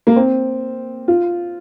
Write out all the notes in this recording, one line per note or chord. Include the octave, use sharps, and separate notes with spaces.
A#3
C4
F4